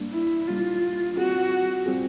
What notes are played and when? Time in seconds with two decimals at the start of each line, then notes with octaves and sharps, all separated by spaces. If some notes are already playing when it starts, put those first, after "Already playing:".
Already playing: G3 A#3 D4
0.13 E4
0.47 G3 A#3 D4 F4
1.17 G3 C4 F4 F#4 G#4
1.86 G3 C4 F4 G#4